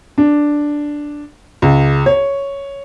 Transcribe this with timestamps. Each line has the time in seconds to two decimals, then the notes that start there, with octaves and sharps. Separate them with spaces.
0.18 D4
1.62 C#2
2.06 C#5